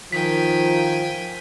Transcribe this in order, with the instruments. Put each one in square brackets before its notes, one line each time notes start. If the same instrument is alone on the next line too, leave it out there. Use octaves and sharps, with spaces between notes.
[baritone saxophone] D#3 [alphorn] F3 [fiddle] G5 G#5 [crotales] B6